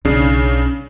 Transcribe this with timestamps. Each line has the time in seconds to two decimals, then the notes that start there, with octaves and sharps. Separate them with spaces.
0.05 B1 C#3 D4